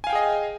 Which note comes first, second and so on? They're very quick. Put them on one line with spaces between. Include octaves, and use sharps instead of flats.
G#5 F5 G5 G#4 D#5